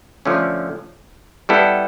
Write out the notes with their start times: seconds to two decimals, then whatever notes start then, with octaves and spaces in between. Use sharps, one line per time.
0.25 D3 F3 A3 C#4
1.49 G3 B3 E4 A4